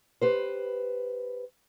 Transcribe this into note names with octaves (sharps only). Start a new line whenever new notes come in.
G4 B4 C5